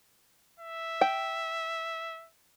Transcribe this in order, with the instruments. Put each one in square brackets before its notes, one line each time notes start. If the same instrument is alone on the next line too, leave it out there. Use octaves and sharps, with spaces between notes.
[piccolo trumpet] E5
[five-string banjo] G5